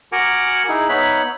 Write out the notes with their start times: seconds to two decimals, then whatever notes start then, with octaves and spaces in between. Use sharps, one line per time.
0.12 F#4 A#4 F#5 G#5 A#5 D6
0.68 D#4 E4 G#4
0.89 B3 D#4 C#5 E5 B5 F#6